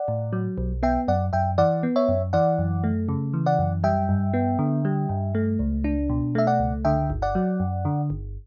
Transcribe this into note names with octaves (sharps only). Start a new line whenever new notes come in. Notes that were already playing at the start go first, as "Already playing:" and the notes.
Already playing: D5 F#5
A2
F#3
B1
B3 E5 G5
F#2 D5 F#5
F#2 E5 G5
E3 D5 F#5
B3
C#5 E5
F#2
E3 D5 F#5
F#2
A3
C#3
E3
D5 F#5
F#2
G3 E5 G5
G2
B3
D3
G3
G2
A3
C#2
D4
B2
A3 E5
D5 F#5
C#2
D3 E5 G5
G1
D5 F#5
F#3
F#2
D3
G1